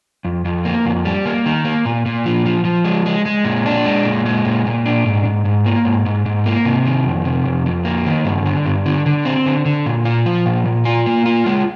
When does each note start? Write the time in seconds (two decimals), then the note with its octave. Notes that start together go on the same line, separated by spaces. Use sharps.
0.25 F2
0.45 F2
0.65 A#3
0.86 F2
1.05 G3
1.25 A#3
1.46 D#3
1.65 A#3
1.85 A#2
2.06 A#2
2.26 F3
2.46 F3
2.65 F3
2.85 G#3
3.06 G#3
3.26 G#3
3.45 A#2
3.66 D4
3.85 G#3
4.05 A#2
4.26 G#3
4.45 A#2
4.66 A#2
4.85 D4
5.05 G#2
5.25 G#2
5.45 G#2
5.66 A#3
5.85 G#2
6.06 G#2
6.26 G#2
6.46 A#3
6.65 C3
6.85 D#3
7.06 F2
7.25 C3
7.45 F2
7.66 F2
7.85 A#3
8.06 D#3
8.25 G2
8.46 D3
8.66 G2
8.86 D3
9.06 D3
9.25 C4
9.46 D3
9.66 D3
9.86 A#2
10.05 F4
10.26 F3
10.46 A#2
10.66 A#2
10.85 F4
11.06 A#3
11.25 F4
11.46 G#3